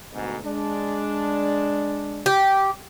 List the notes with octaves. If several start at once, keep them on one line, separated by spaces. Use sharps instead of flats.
D2 G#2 B2
G#3 D4
G4